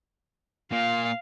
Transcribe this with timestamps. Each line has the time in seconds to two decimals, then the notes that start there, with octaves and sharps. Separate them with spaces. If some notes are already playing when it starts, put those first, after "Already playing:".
0.72 A#2 F5